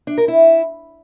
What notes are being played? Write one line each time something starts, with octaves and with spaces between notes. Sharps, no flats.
D4
A#4
E4